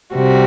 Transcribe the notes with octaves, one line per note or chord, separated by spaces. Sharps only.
C3 G3 F#4